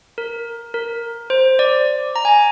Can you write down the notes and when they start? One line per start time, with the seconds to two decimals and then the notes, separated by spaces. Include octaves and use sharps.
0.18 A#4
0.74 A#4
1.30 C5
1.59 D5
2.16 A#5
2.25 G#5